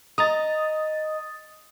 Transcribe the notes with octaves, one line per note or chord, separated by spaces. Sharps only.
D#5 A#5 D#6 A6